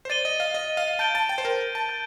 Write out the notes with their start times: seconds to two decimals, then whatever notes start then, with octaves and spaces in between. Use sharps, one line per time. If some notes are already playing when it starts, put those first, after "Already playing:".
0.05 C5
0.10 D5 A6 D#7 G7
0.25 D#5
0.40 F5
0.54 D#5
0.77 F5
0.99 A5 G6 D7 G7
1.15 A5
1.29 G5
1.38 C5
1.45 A#4
1.75 A5
1.89 G6